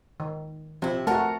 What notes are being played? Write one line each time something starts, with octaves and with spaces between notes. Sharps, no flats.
D#3
C3 F3 C4 E4
A3 F#4 A#4 F#5 A5 A#5